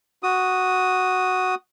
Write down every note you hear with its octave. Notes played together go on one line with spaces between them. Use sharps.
F#4 D#6